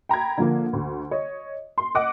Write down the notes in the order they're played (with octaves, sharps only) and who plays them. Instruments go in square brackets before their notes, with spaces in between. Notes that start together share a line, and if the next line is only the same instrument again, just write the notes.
[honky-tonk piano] G5 A#5 B5 G#6
D3 F3 A#3
D2
C#5 D#5
C6
D#5 F#5 D6